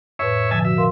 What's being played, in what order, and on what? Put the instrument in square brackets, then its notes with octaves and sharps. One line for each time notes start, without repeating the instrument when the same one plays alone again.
[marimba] F2 A2 B4 [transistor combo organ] C#5 E5
[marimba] B2 D3 F3 [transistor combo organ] E5 G#5 A5
[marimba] F#4 [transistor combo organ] E5
[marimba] A#4 F5 C6